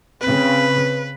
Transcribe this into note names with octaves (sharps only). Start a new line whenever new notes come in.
C#3 C4 B4